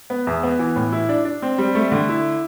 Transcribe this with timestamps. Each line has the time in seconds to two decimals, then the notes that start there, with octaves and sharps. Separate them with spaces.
0.10 B3
0.27 E2
0.43 B3
0.59 E3
0.76 A2
0.92 E4
1.09 D4
1.25 D4
1.42 C4
1.58 G3
1.75 A3
1.92 D3
2.09 E4